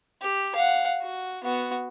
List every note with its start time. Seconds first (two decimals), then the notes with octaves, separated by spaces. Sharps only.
0.22 G4
0.55 F5 F#5
1.02 F#4
1.44 B3 F#4